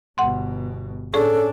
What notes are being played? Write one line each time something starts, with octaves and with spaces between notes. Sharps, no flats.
G1 B2 F#5 C6
A2 C#4 D4 G#4 A4